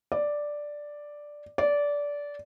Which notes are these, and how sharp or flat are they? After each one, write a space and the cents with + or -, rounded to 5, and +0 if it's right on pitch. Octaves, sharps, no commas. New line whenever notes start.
D5 +0
D5 -20